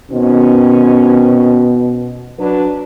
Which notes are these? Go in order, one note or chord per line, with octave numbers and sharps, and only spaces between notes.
B2 D#3 C4 C#4
F#3 D4 B4